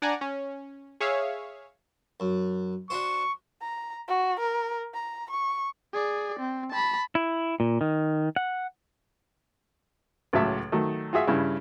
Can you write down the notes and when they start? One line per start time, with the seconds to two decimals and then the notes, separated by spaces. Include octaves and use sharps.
0.02 D4 D5 F#5 G#5 A#5
0.21 C#4
1.00 G#4 C#5 E5 F5
2.20 F#2
2.90 D4 F#4 C5 C#6
3.62 A#5
4.08 F#4
4.40 A#4
4.94 A#5
5.31 C#6
5.94 G#4 D5
6.40 C4
6.71 A5 B5
7.15 E4
7.60 A#2
7.81 D#3
8.36 F#5
10.33 C#2 A2 F#3 A3 E5 A5
10.72 D#3 F#3 A3
11.13 F4 F#4 G#4 E5
11.27 G2 C#3 E4